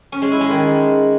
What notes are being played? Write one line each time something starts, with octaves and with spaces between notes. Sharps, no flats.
C#4
G#3
E4
G#3
D#3